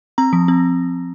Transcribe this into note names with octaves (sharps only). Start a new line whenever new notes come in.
C4 A#5
F3
C4